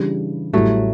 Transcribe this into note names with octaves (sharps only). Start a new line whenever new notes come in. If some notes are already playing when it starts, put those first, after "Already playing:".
Already playing: C#3 E3 G3 D4 G4
A1 A2 E3 F#3 G3 A3